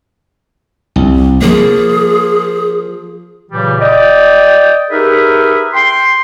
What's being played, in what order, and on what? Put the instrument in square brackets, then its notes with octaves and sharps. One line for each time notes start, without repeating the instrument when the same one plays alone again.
[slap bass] C2
[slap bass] F3 A#3 [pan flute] G#4
[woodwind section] A#2 C#3 E3 F#3 G3
D5 D#5 G5
D#4 G4 G#4 A#4 B4 E5
G5 C6